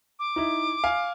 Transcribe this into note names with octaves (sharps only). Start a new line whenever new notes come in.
D6
D#4 E4
F5 G#5